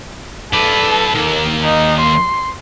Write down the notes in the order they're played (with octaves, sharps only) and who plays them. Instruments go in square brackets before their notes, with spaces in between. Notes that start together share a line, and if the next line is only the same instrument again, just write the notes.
[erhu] A4 [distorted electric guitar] B4 D5
[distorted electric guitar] D#3 A#3
[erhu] D#4
C6